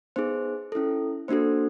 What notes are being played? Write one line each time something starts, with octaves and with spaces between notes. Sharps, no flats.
B3 D#4 G#4 C5
C#4 E4 A4
A#3 D4 F#4 A4 C5